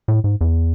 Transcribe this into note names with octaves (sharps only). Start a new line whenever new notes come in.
A2
G#2
E2